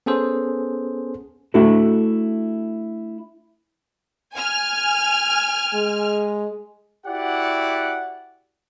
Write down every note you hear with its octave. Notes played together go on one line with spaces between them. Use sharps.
B3 C#4 G#4 A4 C5
A3 D4 E4 F#4 A4
G#5 F6
G#3
E4 F#4 G4 D5 F#5